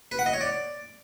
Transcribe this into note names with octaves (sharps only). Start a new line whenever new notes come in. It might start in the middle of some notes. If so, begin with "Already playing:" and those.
B4
F#5
D#5
C#5
D5